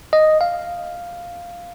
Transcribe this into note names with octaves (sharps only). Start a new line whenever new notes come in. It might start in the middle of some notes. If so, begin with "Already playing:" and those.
D#5
F5